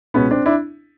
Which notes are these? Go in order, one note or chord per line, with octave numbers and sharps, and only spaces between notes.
C#2 B2 G#3 B3 C#4
C4 D4
D4 E4